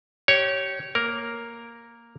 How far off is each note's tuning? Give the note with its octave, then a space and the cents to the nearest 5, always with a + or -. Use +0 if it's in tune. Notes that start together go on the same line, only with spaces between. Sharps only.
G4 -25 C#5 +0
A#3 +0 A#4 +0